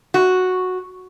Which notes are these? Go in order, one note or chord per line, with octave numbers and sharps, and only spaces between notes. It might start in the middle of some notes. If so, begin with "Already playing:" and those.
F#4